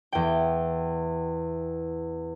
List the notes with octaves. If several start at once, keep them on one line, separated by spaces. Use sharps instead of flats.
E2 G5